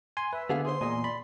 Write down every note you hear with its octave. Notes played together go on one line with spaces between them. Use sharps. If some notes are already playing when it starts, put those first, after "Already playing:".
G#5 C6
B4 E5
D3 B3 G#4 F5
G#4 C5 C6
E2 A#2 D#5 G#5
D5 B5